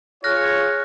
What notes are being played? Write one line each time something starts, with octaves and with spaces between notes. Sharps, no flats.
F4 G#4 C#5 F6 F#6 A#6